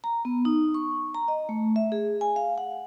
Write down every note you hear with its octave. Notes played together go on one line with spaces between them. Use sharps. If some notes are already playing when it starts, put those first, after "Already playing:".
A#5
B3
D#4
C#6
A#5
D#5
A3
E5
G#4
G#5
F5
F#5